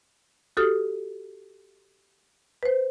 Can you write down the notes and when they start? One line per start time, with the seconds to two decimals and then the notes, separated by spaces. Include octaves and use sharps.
0.57 F#4 G4 A4 D#6 F6
2.63 B4 C5